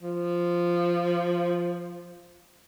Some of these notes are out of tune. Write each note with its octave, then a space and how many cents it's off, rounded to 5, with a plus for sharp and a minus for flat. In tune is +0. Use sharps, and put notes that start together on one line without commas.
F3 -5